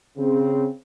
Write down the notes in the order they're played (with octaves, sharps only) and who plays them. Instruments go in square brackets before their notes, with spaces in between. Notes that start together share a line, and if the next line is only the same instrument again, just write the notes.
[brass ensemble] C#3 C4